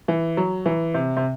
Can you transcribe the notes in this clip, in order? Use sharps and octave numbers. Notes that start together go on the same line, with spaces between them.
E3
F#3
E3
C3
C3